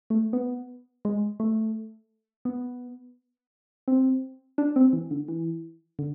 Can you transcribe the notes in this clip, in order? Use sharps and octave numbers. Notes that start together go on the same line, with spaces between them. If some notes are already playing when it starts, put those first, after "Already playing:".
A3
B3
G#3
A3
B3
C4
D4
C4
E3
D3
E3
D3